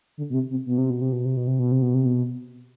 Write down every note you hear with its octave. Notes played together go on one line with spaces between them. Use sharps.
D3
B2
C3
C3
B2
C3
B2
C3
B2
C3
B2
C3
B2
C3
B2
C3
B2